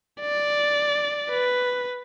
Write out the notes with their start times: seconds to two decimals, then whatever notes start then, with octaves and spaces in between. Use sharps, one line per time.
0.21 D5
1.30 B4